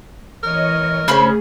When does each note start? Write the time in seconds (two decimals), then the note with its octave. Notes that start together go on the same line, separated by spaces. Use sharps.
0.43 E3 A#4 C#5 D#5
1.08 C#3 A3 C#4 G#4 C5 B5 E6